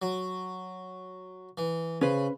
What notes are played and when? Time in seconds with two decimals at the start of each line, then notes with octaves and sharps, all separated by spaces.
0.02 F#3
1.58 E3
2.01 C#3 C#4 B4 C5